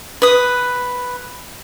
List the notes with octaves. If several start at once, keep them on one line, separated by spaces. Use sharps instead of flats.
B4 D#6